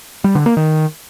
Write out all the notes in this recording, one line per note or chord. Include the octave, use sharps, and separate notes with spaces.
G3
D3
A#3
D#3